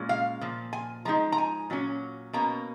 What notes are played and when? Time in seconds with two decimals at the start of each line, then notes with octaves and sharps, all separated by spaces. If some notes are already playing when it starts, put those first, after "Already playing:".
Already playing: A#2 G#3 C#4
0.09 F5
0.41 A#2 F3
0.73 G#5
1.05 F3 G#3 D#4 A#5
1.32 A#5
1.38 G#5
1.70 A#2 F#3 C#4
2.33 B2 A#3 C#4 A#5